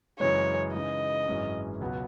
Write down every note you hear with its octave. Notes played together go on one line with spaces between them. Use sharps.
F#2 C#3 E3 G#3 C#5
C#3 E3 G#3 D#4 D#5
G#1 F#2 E3 G#3 C#4
C#2 B2 F#3 B3